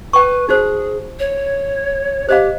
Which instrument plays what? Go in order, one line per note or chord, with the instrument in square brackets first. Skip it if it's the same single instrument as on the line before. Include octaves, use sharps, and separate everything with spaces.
[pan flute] B4 [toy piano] G5 C#6
[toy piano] D#4 F#4 C5 [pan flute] G#4
[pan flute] C#5
[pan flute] G4 [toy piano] C5 D#5 F5